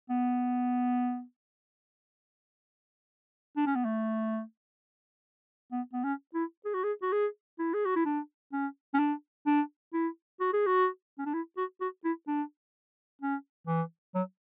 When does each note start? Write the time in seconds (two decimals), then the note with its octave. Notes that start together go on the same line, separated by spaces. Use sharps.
0.10 B3
3.57 D4
3.67 C#4
3.75 B3
3.85 A3
5.72 B3
5.93 B3
6.04 C#4
6.34 E4
6.65 G#4
6.74 F#4
6.84 G#4
7.02 F#4
7.12 G#4
7.59 E4
7.74 G#4
7.85 F#4
7.96 E4
8.05 D4
8.53 C#4
8.94 C#4
8.99 D4
9.47 D4
9.94 E4
10.40 F#4
10.53 G#4
10.66 F#4
11.19 C#4
11.26 D4
11.34 E4
11.57 F#4
11.81 F#4
12.05 E4
12.28 D4
13.22 C#4
13.67 E3
14.15 F#3